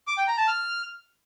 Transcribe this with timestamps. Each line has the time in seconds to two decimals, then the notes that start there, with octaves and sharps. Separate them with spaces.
0.07 D6
0.17 G5
0.28 A#5
0.38 A5
0.48 F6